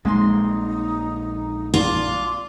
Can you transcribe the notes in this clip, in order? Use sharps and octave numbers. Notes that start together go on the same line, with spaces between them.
A#1 G#3 A#3 C4 D#4 C6
D4 F4